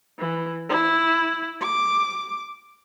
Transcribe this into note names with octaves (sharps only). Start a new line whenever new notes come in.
E3
E4
D6